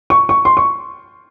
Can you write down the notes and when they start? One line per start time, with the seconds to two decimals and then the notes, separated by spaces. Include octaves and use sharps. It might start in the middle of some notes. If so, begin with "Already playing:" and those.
0.10 C#6
0.29 C#6
0.45 C6
0.57 C#6